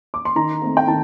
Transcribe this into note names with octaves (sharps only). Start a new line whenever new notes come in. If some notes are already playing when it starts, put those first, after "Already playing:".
D6
C6
D#3 A#5
A3 C4
G5
D#3 A5